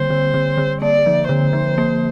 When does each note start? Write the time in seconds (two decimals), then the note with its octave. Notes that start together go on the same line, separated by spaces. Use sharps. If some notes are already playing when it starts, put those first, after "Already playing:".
Already playing: D3 G3 A#3 C5
0.10 D3
0.34 D3
0.57 D3
0.81 A#3 D5
1.06 F3
1.29 D3 C5
1.53 F3
1.78 A#3